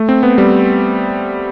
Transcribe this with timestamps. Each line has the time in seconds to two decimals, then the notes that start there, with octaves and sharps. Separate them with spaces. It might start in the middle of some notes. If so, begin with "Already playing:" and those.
Already playing: A3
0.09 C4
0.23 B3
0.38 G3